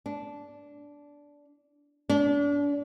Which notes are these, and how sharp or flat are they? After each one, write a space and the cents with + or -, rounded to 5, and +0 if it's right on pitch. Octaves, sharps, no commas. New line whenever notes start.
D4 -15
D4 -35